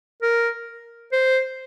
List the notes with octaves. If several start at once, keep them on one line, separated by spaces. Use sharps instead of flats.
A#4
C5